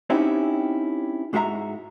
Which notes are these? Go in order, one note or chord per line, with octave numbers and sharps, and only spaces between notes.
C4 C#4 D#4 E4 F#4 G4
G#2 G#3 F#4 G4 E5 A#5